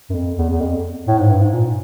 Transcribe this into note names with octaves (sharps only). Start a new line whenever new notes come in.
F#2
F2
E2
E2
F2
A2
G#2
G2
G#2
A#2